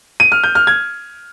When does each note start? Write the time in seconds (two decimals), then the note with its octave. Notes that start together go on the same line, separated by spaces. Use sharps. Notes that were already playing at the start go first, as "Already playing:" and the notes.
0.20 D#7
0.32 F6
0.44 G6
0.55 F6
0.67 G#6